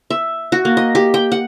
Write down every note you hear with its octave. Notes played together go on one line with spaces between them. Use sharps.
E5
F#4
A#3
D#5
G4
G5
F#5